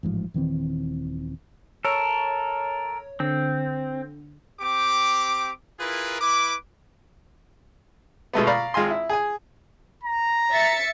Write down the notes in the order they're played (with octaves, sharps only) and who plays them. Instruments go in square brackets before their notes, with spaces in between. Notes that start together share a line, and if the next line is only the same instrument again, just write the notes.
[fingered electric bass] A1 G#2 C3 F3
D#1 D#3 E3 C4
[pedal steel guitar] A4 A#4 [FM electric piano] C#5
[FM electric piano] D3 [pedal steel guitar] C4
[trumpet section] C4 G4 D6
E4 F4 G#4 A#4 B4
E4 B4 D6
[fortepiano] B2 G#3 A3 B3
D5 F5 A#5 B5 C#6
G#1 G#3 F4 G#5 C6
E4
G#4 G#5
[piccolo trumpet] A#5
[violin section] E5 A6 C#7